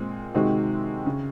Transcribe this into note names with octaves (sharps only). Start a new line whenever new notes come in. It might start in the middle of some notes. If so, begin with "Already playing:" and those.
Already playing: A#2 G#3 C4
C3 D#3 G#3 C4 F#4
C#3